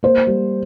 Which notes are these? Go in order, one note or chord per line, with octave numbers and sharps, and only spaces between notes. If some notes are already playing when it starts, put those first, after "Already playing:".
A#3 C5
G3